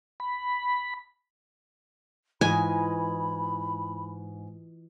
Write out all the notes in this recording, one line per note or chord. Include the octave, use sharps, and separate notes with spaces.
B5
G#2 E3 F4 D#5 G#5 B5